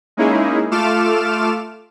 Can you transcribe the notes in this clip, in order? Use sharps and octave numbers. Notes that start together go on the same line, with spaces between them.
G#3 A#3 C#4 D#4 E4 G#4
A3 F4 A4 D6 F6 E7